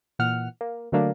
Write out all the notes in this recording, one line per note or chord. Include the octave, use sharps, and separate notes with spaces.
A#2 E3 F#5 F6
A#3
D3 F#3 A3 A#3 D4